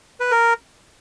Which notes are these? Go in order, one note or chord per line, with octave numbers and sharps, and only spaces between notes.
B4
A#4